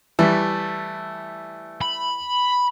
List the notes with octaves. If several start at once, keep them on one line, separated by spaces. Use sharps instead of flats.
E3 G3 A3
B5